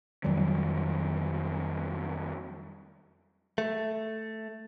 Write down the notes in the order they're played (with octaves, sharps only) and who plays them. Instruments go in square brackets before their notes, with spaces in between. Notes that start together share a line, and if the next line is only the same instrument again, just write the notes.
[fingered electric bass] F2 D#3 F#3 G3
[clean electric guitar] A3